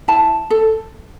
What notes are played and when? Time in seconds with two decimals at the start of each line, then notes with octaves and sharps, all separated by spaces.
0.08 E4 A5
0.50 A4